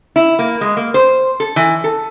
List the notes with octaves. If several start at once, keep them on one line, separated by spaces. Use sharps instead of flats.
E4
A#3
G#3
A#3
C5
A4
E3
A4